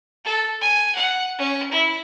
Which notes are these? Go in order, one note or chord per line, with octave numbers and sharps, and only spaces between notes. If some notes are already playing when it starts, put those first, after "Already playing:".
A4
G#5
F#5
C#4
E4